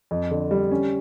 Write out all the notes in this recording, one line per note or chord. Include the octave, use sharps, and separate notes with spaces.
F2
D3
G3
C#4